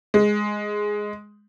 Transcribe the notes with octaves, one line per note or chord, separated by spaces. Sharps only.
G#3